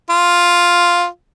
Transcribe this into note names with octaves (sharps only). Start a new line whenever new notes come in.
F4